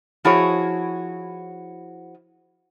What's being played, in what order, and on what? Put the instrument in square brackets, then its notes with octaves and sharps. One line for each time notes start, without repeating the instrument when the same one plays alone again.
[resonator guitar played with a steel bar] F3 E4 F#4 G#4 C#5